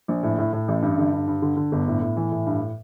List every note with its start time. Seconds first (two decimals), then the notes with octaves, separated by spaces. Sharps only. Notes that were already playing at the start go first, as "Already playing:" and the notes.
0.08 A#1
0.23 A2
0.38 A2
0.53 A2
0.68 A1
0.82 G2
0.98 D3
1.13 G2
1.27 G2
1.42 D3
1.57 D3
1.72 G1
1.87 A2
2.02 A2
2.17 E3
2.32 A2
2.46 G2